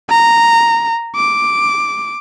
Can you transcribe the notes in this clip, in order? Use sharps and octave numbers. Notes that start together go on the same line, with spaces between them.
A#5
D6